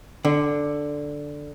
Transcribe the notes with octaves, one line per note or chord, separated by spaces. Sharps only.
D3